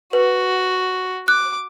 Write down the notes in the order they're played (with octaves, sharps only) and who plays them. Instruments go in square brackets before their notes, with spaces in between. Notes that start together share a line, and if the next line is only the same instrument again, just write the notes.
[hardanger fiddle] F#4 [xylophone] B4
[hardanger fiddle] D6 [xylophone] F#6